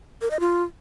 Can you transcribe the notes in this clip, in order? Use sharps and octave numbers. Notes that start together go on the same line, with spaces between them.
A#4
D#5
F4